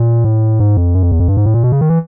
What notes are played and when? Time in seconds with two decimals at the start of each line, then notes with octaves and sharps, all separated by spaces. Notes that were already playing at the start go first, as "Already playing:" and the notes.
Already playing: A#2
0.24 A2
0.60 G#2
0.77 F2
0.94 F#2
1.03 F2
1.12 E2
1.20 F2
1.28 G2
1.37 G#2
1.46 A2
1.54 A#2
1.63 B2
1.72 C#3
1.81 D#3
1.90 E3